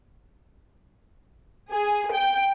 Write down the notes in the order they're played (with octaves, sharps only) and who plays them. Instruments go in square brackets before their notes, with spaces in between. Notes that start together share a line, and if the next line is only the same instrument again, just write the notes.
[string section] G#4
G5